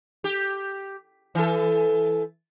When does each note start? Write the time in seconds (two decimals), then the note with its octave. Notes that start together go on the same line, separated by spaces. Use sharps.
0.24 G4
1.35 E3 A4